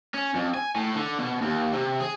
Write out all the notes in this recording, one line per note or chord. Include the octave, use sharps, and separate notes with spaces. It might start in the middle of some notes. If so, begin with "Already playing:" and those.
C#4
F2
G#5
A2
D3
B2
D#2
C3
G#4